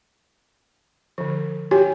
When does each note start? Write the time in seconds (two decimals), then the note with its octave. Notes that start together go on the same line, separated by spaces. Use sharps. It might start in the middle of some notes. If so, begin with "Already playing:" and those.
1.18 D3 F3
1.71 F#4 G4 C#5 G#5